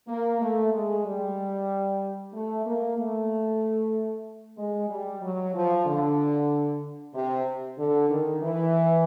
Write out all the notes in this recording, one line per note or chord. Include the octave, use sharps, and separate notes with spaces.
A#3
A3
G#3
G3
A3
A#3
A3
G#3
G3
F#3
F3
D3
C3
D3
D#3
E3